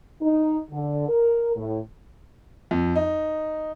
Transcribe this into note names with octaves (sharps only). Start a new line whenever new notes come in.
D#4
D3
A#4
A2
F2
D#4